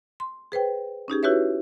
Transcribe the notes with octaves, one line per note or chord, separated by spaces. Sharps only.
C6
G#4 B4 C5 G5
C#4 D#4 G4 G#4
E4 F#4 G4 B4 C#5 E5